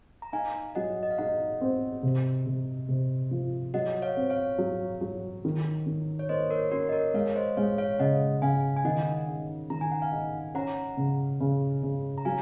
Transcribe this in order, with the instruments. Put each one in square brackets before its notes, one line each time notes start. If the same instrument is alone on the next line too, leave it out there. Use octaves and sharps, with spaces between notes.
[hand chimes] A#5
[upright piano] D#4 [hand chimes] F5 G#5
[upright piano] F#3 [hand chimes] D#5 F#5
[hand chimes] D#5
F5
[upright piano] D#4 [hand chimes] D#5 F#5
[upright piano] C4
C3
C3
C3
F3
[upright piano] F#3 [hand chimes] D#5 F#5
[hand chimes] C#5 F5
[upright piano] C4
[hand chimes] C#5 F5
[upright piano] F#3
F#3
D#3
D#3
[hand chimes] C#5
[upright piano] A#3 [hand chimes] C5 D#5
[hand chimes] A#4 C#5
[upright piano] C#4 [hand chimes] F#4 A#4
[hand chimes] D#5
A#4 C#5
[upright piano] G#3 [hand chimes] C#5 F5
[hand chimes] C5 D#5
[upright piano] G#3 [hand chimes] C#5 F5
[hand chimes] C#5 F5
[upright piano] C#3 [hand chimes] D#5 F#5
[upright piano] C#3 [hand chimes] F5 G#5
[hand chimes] G#5
[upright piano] D#3 [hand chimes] D#5 F#5
[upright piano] D#4
[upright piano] D#3 [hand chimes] A#5
[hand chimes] G#5
F#5
F5 G#5
[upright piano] D#4
[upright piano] C#4 [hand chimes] F#5 A#5
[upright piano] C#3
C#3
C#3
[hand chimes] A#5
[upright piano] F#3 [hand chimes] F5 G#5